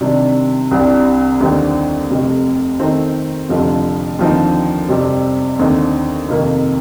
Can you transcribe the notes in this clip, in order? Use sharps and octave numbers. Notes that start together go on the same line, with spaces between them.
C3 D#3 G3 D4
C2 C3 G3 D4
D#2 D3 G3 C4 D#4
F1 F2 C3
D#3 A3 C4 D#4
F1 F2 D3 F3 A3
D#2 D3 F3 C4 D#4
F2 C3 G3 C4 G4
D#2 D3 A3 C4 D#4
F2 C3 D#3 A#3